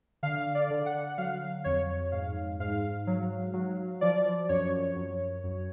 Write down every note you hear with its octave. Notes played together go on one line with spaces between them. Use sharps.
D3 F5
D5
D3
F#5
F#3 F5
F2 C#5
G#2 F5
G#2 F5
F#3
F#3
F3 D5
F#2 C#5
F#2
F#2